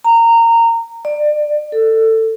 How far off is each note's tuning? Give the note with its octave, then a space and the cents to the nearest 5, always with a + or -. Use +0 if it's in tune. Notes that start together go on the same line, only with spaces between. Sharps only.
A#5 -20
D5 +25
A4 +20